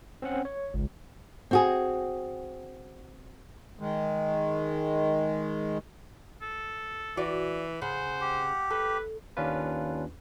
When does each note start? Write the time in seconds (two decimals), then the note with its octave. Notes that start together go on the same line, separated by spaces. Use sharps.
0.22 C4 C#4 F#5
0.45 C#5
0.74 G#1 C#2
1.51 C4 F#4 G#4
3.80 D#3 G#3
6.42 A4
7.17 E3 F#4 D5
7.82 C#3 C5 F#5
8.21 G4
8.70 A4 B4
9.37 D#2 C#4 D4 F4 B4